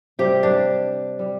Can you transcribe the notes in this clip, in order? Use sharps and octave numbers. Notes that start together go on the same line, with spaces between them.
C3 G3 G4
D4
G3